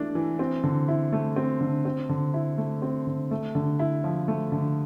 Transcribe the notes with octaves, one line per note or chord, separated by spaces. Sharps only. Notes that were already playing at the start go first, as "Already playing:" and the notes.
Already playing: E3 A3 D4
E3
C4
D3
E4
A3
C4
D3
C4
D3
E4
A3
C4
D3
A3
D3
E4
F3
A3
D3